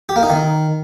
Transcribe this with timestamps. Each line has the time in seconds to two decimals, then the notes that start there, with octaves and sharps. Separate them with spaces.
0.09 G4
0.16 A#3
0.23 D#4
0.30 D#3